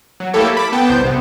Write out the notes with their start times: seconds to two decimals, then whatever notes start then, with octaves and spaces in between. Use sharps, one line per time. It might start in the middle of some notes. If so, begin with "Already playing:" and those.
0.20 F#3
0.33 A3 A#3 E4 G4 A4 C#5
0.55 A5 B5 D6
0.72 B3 G5 A5
0.89 C2 C5 G6
1.05 C3 B3